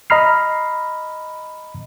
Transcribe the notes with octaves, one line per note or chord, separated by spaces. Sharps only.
D#5 A#5 B5 F6 C7